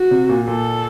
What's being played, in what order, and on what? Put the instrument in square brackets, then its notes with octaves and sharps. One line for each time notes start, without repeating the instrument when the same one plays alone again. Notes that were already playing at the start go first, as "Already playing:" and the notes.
Already playing: [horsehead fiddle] F#4
[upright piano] C3
A#2
[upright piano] A#2 [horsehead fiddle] A4